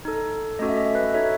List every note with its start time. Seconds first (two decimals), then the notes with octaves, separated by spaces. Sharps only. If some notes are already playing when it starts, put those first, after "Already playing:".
0.05 D#4 A4
0.59 A3 C#4 F#4 A4 D#5
0.69 E5
0.77 D#5
0.86 E5
0.95 B4 D#5
1.14 D#4 F#4 A4 C#5 E5